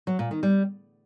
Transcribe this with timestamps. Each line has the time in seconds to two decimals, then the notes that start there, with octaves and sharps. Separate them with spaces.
0.07 F#3
0.19 A#2
0.31 D#3
0.43 G3